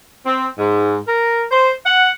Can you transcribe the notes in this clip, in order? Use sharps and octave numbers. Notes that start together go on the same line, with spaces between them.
C4
G#2
A#4
C5
F#5